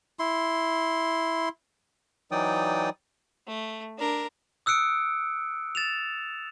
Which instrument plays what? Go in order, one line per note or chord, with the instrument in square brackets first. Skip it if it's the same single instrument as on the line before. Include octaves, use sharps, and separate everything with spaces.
[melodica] E4 C6
[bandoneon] E3 F#3 D#4 D5 G5 D#6
[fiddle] A3
D4 A#4
[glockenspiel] D#6 E6 F#6 C#7 D7
A6 E7 F7